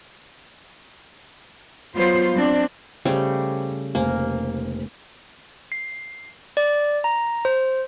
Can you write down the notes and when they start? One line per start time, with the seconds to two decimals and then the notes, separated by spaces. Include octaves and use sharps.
1.95 F#3 B3 F4 C5
2.35 G3 C4 D4
3.05 C#3 G3 A3 G4 C5
3.95 F1 A#3 C5 G#5
5.72 C7
6.57 D5
7.04 A#5
7.45 C5